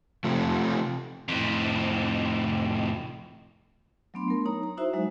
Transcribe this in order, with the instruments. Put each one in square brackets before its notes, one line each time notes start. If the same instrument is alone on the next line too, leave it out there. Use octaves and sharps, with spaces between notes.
[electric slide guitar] C3 F3 A3
[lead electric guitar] F2 A2
[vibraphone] F#3 A3 B3 D4 C6
A3 A#4
D#4 C#5 A#5
A#5
D#4 E4 F#4 C5 E5
F#3 G#3 D#4